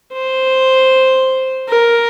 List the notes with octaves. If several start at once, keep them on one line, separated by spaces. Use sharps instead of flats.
C5
A#4